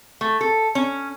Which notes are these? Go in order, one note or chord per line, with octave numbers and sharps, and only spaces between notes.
A3
A4
C#4